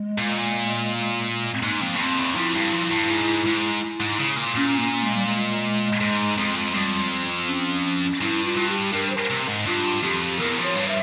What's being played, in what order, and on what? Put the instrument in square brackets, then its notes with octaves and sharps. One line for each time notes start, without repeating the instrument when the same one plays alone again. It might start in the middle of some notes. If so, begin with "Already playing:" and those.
Already playing: [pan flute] G#3
[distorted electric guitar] A#2
[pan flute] C4
[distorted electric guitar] G#2 [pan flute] A#3
[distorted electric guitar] F2
G2
[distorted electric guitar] F2 [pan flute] C4
[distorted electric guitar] E2
[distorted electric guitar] F2 [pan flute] E4
[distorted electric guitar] G2
F2
G2
G#2
G#2
G#2
C#3
A#2
[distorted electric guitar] A#2 [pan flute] C#4
[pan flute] A#3
G#3
G3
G#3
[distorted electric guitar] G#2
F2
[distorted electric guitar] F2 [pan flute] G3
[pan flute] C4
C#4
[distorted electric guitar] G2 [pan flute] E4
[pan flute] F4
[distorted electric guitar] G2
[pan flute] G4
[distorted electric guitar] G2 [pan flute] A#4
[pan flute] C5
A#4
[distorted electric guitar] C3
G#2
[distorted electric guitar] G2 [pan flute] F4
[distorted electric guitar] F2 [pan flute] G4
[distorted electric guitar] E2 [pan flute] A#4
[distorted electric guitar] F2
[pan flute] C#5
[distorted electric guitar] G2
[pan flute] E5